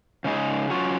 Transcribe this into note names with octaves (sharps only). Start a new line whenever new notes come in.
C#3 G#3 D#4 G#4
F#3 C#4 F4